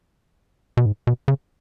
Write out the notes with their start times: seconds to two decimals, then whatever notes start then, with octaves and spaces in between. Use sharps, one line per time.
0.77 B2
0.86 G#2
1.07 B2
1.28 C#3